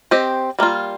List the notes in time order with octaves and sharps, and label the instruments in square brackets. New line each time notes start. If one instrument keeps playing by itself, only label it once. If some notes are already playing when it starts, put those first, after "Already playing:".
[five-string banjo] C4 G4 C5 D#5
G3 A#3 F4